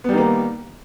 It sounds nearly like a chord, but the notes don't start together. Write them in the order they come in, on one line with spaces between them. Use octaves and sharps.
B3 G3 D#3 A#3